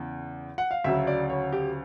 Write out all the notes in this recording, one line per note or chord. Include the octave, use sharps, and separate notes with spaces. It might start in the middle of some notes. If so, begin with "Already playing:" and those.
Already playing: E2 C#3
F#5
F5
D2 C#3 F#3 E5
D5
C#5
G4